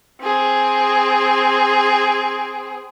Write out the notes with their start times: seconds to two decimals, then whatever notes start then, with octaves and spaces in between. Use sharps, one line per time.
0.22 C4 G#4